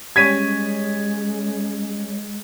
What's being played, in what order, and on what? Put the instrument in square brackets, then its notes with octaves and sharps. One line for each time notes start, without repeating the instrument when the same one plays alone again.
[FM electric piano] G3 C#4 C#5 [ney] G#3 [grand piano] G#6 B6 D#7